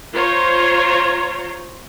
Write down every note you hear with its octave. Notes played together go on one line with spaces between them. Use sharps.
F4 C5 C#5 A#5